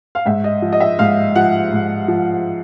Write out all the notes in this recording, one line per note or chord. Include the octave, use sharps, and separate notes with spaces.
F5
G#2 E5
D#5
F3
D#5
E5
G#2 F5
F3 F#5
G#2
F3